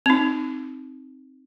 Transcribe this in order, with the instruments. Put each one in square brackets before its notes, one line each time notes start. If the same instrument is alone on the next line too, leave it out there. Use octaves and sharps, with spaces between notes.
[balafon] C4 D#4